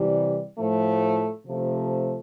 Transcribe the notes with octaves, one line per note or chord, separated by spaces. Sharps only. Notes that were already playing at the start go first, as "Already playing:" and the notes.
Already playing: C3 E3 G3
A2 F3 A3
C3 F3 A3